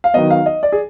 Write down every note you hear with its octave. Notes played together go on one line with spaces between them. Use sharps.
F5
D#3 F#3 B3 D#5
F5
D#5
D5
G#4